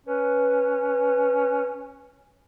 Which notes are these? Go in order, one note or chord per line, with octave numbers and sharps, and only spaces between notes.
C#4 B4